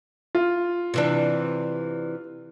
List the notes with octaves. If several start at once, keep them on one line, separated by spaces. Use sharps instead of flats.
F4
C3 E3 D4